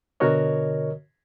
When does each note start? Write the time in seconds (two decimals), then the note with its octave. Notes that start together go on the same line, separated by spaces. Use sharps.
0.20 B2 D3 F#4 A#4 C#5 D#5